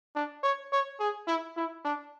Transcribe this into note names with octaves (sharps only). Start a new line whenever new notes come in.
D4
C#5
C#5
G#4
E4
E4
D4